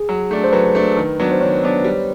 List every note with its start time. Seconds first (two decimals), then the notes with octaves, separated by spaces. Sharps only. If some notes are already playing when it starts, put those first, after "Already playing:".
Already playing: G#4
0.09 F#3
0.31 A3 D4
0.44 C5
0.52 F#3 B4
0.75 A3 D4
0.97 D#3
1.20 F#3 B3 D4
1.32 C5
1.41 D#3 C#5
1.63 F#3 B3 D4
1.85 G3